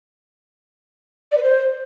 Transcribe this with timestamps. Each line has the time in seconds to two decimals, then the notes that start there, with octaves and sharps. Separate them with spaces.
1.31 D5
1.37 B4
1.43 C5